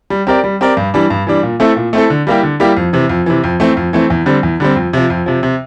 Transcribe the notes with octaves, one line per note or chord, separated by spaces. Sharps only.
G3
C4 G4 A#4 D5
G3
C4 G4 A#4 D5
G2
E3 G3 D4
G2
E3 G3 D4
A#2
A3 C4 E4 A4
A#2
A3 C4 E4 A4
D3
G3 A#3 E4 G4
D3
G3 A#3 E4 G4
F2
C3 E3
F2
C3 E3
F2
E3 A3 C4
F2
E3 A3 C4
E2
D3 G3 C4
E2
D3 G3 C4
F2
C3 F3
F2
C3 F3
C3